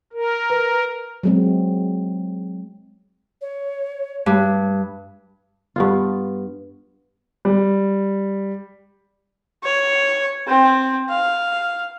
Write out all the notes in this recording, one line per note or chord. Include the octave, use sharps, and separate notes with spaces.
A#4
B4
F#3 G#3 C4
C#5
G2
G2 B3 F4
G3
C#5
C4
F5